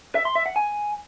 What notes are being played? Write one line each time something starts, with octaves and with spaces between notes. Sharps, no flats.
E5
C6
E5
F#5
G#5